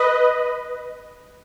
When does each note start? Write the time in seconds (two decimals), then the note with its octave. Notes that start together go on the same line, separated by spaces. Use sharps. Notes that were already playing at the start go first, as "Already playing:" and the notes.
Already playing: B4 D#5